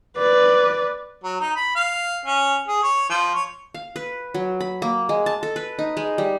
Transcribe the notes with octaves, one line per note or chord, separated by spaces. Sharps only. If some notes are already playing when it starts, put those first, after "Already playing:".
B4 D5
F#3
D#4
B5
F5
C#4
G#4
C#5
F3
C#5
F5
B4
F#3
B5
A#3
G#3
A5
A4
B4
D#4
G#3
G3